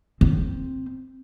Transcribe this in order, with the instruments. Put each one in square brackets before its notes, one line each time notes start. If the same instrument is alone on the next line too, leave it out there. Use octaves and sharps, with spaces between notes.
[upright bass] C4